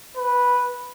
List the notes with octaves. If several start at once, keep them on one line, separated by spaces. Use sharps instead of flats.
B4